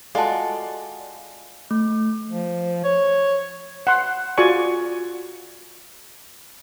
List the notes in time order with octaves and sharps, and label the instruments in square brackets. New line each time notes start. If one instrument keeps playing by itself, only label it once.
[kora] G#3 [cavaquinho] F4 F#4 [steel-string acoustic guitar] A4 D5 [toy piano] A5 C6
[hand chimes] A3
[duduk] F3
C#5
[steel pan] F#5 C6
F4 F#4 G#4 D5 G#5 C#6